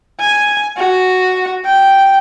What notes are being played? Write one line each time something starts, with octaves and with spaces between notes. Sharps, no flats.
G#5
F#4
G5